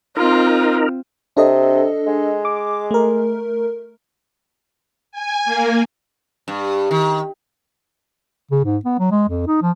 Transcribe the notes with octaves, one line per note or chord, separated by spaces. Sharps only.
C4 D#4 F4 A#4
C3 D4 A4 D#5
G#3
D6
A3 A#4
G#5
A#3
G2
D#3
C#3
G#2
B3
F#3
G#3
F2
D#4
F3